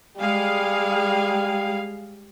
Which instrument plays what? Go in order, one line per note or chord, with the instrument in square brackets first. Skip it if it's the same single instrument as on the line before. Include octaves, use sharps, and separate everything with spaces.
[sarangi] G3 [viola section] G#3 G#4 F5